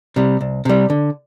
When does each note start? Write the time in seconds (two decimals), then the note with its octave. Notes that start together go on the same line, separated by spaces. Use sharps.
0.16 C3 G3
0.41 C2
0.65 C3 G3
0.90 D3